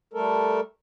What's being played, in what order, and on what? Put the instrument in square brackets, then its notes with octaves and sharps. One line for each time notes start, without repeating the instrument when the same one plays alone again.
[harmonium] G3 A3 A4 A#4